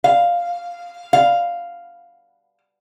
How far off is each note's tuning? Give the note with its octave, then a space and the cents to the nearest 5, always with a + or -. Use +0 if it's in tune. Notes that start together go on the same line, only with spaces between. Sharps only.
F5 +0
F5 -5